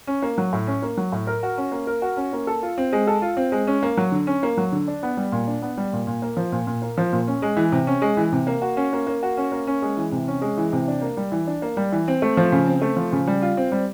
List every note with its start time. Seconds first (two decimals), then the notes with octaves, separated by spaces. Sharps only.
0.07 C#4
0.22 A#3
0.38 F#3
0.53 A2
0.67 C#4
0.82 A#3
0.97 F#3
1.12 A2
1.27 A#4
1.43 F#4
1.57 C#4
1.72 A#3
1.87 A#4
2.02 F#4
2.17 C#4
2.33 A#3
2.47 A4
2.63 F4
2.78 C4
2.93 G#3
3.07 A4
3.22 F4
3.37 C4
3.52 G#3
3.67 C#4
3.83 A#3
3.97 F#3
4.12 D3
4.27 C#4
4.43 A#3
4.57 F#3
4.72 D3
4.88 D4
5.03 B3
5.17 G3
5.32 A#2
5.47 D4
5.62 B3
5.77 G3
5.93 A#2
6.07 A#2
6.22 A#3
6.37 F3
6.52 A#2
6.67 A#2
6.82 A#3
6.98 F3
7.13 A#2
7.27 C#4
7.42 G#3
7.57 E3
7.72 C3
7.87 C#4
8.02 G#3
8.17 E3
8.32 C3
8.47 A#3
8.62 F#4
8.77 C#4
8.93 A#3
9.07 A#3
9.23 F#4
9.37 C#4
9.52 A#3
9.67 C#4
9.82 G#3
9.97 E3
10.12 C3
10.28 C#4
10.42 G#3
10.58 E3
10.72 C3
10.88 D4
11.02 A#3
11.17 G3
11.32 E3
11.47 D4
11.62 A#3
11.77 G3
11.92 E3
12.08 C4
12.22 A3
12.37 F3
12.52 C#3
12.67 C4
12.82 A3
12.97 F3
13.13 C#3
13.27 G3
13.42 F4
13.57 C4
13.72 G3